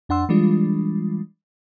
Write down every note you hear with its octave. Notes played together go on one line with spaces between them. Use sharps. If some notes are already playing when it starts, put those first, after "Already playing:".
F2 D4 F#5 C6 E6
E3 G3 G#3 D4 F4